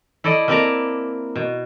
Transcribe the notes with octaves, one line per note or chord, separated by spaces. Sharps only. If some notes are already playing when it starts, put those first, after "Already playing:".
E4 A4 D5 D#5
A#3 C4 E4 D5 A5 A#5
B2